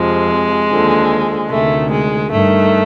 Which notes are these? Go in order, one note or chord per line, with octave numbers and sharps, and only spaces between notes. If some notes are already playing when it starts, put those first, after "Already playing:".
Already playing: F2 C3 F3 G#3
D#2 D3 F3
D2 C3 D#3 A3
G#3
G2 D#3 A3